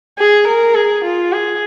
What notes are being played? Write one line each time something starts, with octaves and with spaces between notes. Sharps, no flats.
G#4
A#4
G#4
F4
G#4